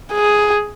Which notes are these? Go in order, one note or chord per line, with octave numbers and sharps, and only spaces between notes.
G#4